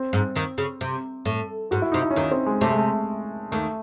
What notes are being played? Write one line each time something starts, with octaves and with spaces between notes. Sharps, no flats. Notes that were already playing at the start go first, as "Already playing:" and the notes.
Already playing: C4
G#2
D#2 D#3
C#3
C3
A2
G#2 F#4
E4
C3 D#4
E4
C#4
D#2 D#3 D#4
C4
G#3
C3 A3
G#3
A3
D#2 D#3 A3